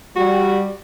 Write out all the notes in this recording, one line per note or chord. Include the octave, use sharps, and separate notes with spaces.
G3 F#4